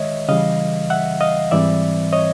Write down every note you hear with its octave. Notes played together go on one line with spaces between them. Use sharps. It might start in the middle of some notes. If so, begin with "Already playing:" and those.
Already playing: D#3 G#3 C#5 D#5 E5
C#3 E3 G3 D#5 F5
E5 F#5
D#5 F5
G#2 E3 G3 C4 D5 E5
C#5 D#5